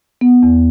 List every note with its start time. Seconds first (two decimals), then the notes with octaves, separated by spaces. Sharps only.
0.21 B3
0.43 E2